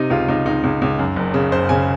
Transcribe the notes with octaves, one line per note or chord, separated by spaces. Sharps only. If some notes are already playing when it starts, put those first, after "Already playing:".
Already playing: C3 D#4
C#2 F4
C#2 D#4
C#2 D#4
C#2
C#2
F#2
F#1
C#3
F#1 C5
C#3 G#5